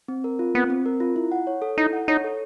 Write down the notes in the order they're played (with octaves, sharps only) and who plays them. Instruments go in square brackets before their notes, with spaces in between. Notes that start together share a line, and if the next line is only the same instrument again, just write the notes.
[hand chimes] C4
A#4
F4
[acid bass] B3 [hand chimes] C4
[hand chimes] C4
A#4
F4
E4
F#5
C#5
A4
[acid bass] D#4 [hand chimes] E4
[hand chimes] F#5
[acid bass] D#4 [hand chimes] C#5
[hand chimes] A4